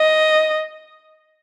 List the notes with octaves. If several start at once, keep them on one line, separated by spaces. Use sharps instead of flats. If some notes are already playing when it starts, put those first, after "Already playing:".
Already playing: D#5